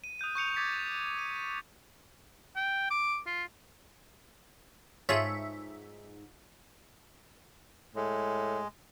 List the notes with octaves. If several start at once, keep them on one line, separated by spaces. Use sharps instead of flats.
D#7
D#6 F#6 G6 D#7
C#6 G6 C#7 F7
D6 G#6 A6 B6
D#7
G5
D6
F4
G#2 F4 G#4 A4 C#5 E5
A2 G#3